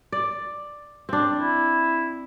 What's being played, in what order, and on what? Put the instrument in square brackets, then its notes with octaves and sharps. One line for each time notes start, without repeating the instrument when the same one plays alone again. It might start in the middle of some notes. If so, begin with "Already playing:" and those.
[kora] D5
C4 D4
[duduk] E4